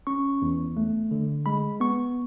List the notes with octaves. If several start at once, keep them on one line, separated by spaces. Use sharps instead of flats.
C#4 C#6
E2
A3
D3
G#3 B5
B3 C#6